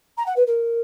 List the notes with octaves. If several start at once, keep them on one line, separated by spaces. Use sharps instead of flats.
A#5
F#5
B4
A#4